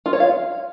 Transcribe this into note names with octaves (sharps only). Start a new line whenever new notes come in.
F4
C#5
F5